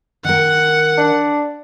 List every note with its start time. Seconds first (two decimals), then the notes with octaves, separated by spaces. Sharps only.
0.25 D#3 A#4 F#5
0.98 D4